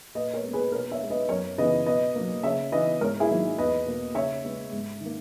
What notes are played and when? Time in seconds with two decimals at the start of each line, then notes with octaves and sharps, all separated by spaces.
0.15 A#2 B4 D#5
0.34 A#4 C#5
0.43 G#3 B3
0.53 G#4 B4
0.72 B2 A#4 C#5
0.91 C#5 E5
1.01 G#3 B3
1.10 B4 D#5
1.29 F#2 A#4 C#5
1.58 C#3 E3 B3 B4 D#5
1.86 B2 B4 D#5
2.15 F#3 A#3
2.43 C#3 C#5 E5
2.72 E3 B3 B4 D#5
3.00 G#2 A#4 C#5
3.20 E4 G#4
3.30 D#3 F#3 A#3
3.58 E2 B4 D#5
3.86 B2 A#3
4.15 C#3 C#5 E5
4.44 G#3 B3
4.72 G#2
5.00 D#3
5.05 A#3